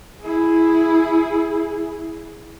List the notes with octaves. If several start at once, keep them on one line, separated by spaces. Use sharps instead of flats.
E4 G#4